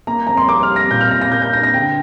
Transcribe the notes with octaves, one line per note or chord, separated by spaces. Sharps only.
A#3 A#5
F2 A#5
C6
C3 D6
F6
G3
A#6
A#2 G6
F6
A#2 A#6
A#6
A#3 G6
G6
D4 A#6
A#6
D3 G5